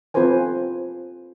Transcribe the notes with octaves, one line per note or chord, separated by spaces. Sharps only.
C4 F4 A4 B4 C5 G#5